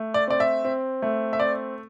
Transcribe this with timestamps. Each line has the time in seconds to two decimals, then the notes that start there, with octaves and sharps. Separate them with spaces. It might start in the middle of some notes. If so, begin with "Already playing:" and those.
Already playing: A3
0.14 D5
0.28 C4 D5
0.40 E5
0.65 C4
1.02 A3
1.33 E5
1.39 C4 D5